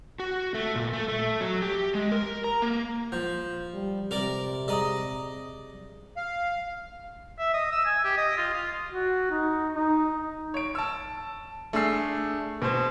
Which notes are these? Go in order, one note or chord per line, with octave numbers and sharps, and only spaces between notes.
F#4
A3
A#2
A3
A3
F#3
G4
G#3
A#4
A#5
A#3
F3 G6
G3
C3 A#4 D5 F7
G#4 D5 D#5 A#5 D#6
F5
E5
D#5
E6
G#5
G4
D#5
F4
F4
F#4
D#4
D#4
C#5 D7
A5 E6
A3 D4 G#4 E6 C7
B2 C5